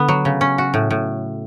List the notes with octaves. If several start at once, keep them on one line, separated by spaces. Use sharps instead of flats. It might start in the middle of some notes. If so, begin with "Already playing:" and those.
Already playing: D3 B3
F#3
C#3
C#4
F#4
A2
A2